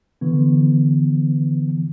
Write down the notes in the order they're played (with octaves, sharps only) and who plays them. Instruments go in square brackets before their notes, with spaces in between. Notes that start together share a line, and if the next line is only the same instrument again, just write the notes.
[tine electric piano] D3 E3 B3